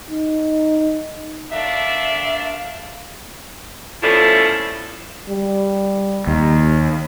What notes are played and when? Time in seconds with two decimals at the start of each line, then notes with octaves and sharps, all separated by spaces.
0.10 D#4
1.52 D3 D#3 D4 E5 F5
4.03 B2 F3 A3 C#4 E4 D5
5.29 G3
6.27 D#2